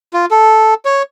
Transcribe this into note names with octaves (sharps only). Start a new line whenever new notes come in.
F4
A4
C#5